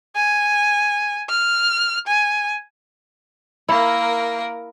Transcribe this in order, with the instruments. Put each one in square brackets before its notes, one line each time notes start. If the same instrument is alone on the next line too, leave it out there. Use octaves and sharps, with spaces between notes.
[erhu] G#5
F6
G#5
[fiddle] A#3 A#4 [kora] E4